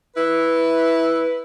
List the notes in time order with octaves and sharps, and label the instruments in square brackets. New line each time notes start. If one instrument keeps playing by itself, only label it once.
[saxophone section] E4 B4